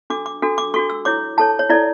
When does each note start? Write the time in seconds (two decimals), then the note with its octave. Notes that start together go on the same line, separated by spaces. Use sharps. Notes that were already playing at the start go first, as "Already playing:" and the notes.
0.10 D4 F#4 A4 D6
0.26 D6
0.42 D4 F#4 A4
0.58 D6
0.74 D4 F#4 A4 C#6
0.90 E6
1.05 E4 A4 C#5 D6
1.37 E4 A4 C#5 A5
1.59 C#5
1.70 E4 A4 C#5 D5